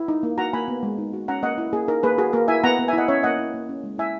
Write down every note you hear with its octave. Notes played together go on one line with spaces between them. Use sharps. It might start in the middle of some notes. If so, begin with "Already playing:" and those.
Already playing: E4
D#4
A#3
F#4 F#5 A#5
A#3 G#5 B5
B3
G#3
D#4
F#4
C#4 F#5 A#5
A#3 D#5 F#5
E4
A#3 G#4
D#4 A#4
A#3 G#4 B4
F#4 G#4
A#3 A#4
E4 E5 G#5
B3 F#5 A#5
B3
E5 G#5
E4 D#5 F#5
C#4 C#5 E5
A#3 D#5 F#5
E4
A#3
C#4
G#3
E4 E5 G#5